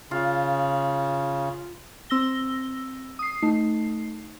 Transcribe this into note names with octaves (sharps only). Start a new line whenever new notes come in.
C#3 F4
C4 E6 A#6 G7
D#6 C7
A3 D#4 C7